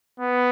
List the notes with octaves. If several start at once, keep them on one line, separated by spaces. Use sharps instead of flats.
B3